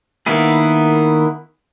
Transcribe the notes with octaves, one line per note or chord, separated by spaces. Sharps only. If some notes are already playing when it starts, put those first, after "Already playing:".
D#3 A#3 B3 E4 G#4